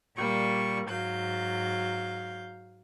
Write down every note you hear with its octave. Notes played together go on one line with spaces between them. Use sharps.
A#2 G3 A#3 C#6
G#2 F#3 F5 G6